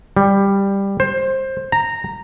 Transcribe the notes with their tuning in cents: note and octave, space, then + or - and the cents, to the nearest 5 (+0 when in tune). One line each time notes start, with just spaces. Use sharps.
G3 +10
C5 +15
A#5 -10